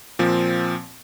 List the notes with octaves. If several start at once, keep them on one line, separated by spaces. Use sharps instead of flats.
A#2 F3 C4